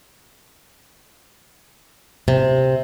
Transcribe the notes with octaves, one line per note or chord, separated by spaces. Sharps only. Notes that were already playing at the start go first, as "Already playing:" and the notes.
C3